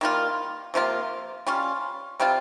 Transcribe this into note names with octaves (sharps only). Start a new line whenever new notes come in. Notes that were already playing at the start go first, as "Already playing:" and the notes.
D#3 G3 A#3 F4
C3 F3 A#3 F4
G3 C#4 F4
C3 G3 C4 F4